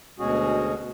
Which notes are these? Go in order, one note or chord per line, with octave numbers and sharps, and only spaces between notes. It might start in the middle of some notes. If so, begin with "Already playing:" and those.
D2 B2 G#3 C#4 F#4 G#4